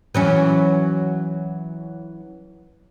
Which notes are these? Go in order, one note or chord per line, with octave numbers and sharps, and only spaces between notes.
E3 F#3 C#4